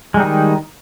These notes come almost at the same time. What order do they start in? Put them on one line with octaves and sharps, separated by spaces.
G#3 G3 D#4 D#3